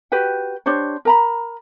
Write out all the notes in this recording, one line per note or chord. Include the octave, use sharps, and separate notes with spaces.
F#4 G4 B4 G5
D4 G4 C5 C#5
A#4 A#5 B5